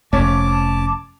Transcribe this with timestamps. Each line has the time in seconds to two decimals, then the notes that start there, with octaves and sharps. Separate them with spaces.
0.13 F1 A3 C#4 C#5 A5 D6